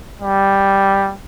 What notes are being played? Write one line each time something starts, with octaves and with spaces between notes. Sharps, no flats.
G3